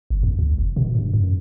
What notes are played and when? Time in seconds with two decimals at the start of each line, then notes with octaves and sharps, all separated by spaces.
0.10 G1
0.23 E2
0.39 D2
0.58 F1
0.76 B2
0.95 G2
1.14 F#2